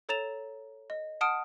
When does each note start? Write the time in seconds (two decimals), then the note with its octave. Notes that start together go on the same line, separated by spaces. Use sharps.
0.09 A4 C#5 A#5 A6 E7 F7
0.90 D#5
1.21 F#5 A5 D#6 F6 D7